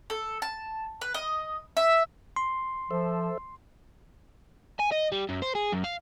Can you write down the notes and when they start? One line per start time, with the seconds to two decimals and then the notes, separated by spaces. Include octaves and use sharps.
0.10 A4
0.42 A5
1.01 B4
1.14 D#5
1.77 E5
2.36 C6
2.91 F3 A4 C5 E5
4.79 G#5
4.92 D#5
5.12 G3
5.29 F#2
5.42 C5
5.55 G#4
5.72 F#2
5.84 F5